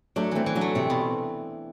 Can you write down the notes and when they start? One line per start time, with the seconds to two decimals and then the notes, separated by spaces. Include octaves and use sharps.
0.16 F#3 A3 D4
0.31 E3 A3 C4
0.46 E3
0.55 D3 F#3
0.61 A3
0.75 C3 C4
0.90 B2